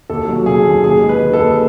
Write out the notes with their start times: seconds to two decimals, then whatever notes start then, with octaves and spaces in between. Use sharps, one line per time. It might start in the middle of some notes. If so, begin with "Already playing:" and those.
0.10 D#2 A4
0.28 F#3
0.46 C#3 G#4
0.65 D#2
0.83 D#2 G#4
1.02 G#3
1.09 B4
1.21 D#3
1.33 A4
1.40 D#2